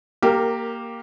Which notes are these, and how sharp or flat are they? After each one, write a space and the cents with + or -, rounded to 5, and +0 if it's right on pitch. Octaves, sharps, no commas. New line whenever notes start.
A#3 +0 G4 +0 A#4 -20